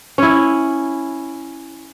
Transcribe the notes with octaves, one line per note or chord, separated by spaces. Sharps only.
C#4 E4